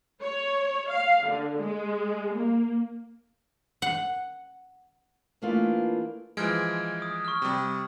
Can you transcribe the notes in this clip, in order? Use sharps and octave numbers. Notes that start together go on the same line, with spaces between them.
C#5
F5
D3
G#3
A#3
F#5
E3 A3 A#3 D4 F4 B4
E3 F3 G#3 F6 G#6 D7
D#6
C#6 F6
C3 G3